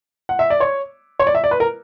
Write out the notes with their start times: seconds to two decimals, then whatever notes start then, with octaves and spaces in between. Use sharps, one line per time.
0.29 F#5
0.39 E5
0.50 D5
0.60 C#5
1.20 C#5
1.27 D5
1.35 E5
1.44 D5
1.51 B4
1.60 A#4